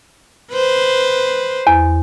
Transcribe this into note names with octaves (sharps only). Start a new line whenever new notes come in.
B4 C5
E2